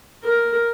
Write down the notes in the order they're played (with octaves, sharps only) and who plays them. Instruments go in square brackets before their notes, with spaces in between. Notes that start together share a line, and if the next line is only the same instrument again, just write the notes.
[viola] A#4